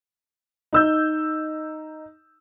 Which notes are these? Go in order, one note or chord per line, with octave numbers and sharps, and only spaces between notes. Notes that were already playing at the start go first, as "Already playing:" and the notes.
D#4 E6 G6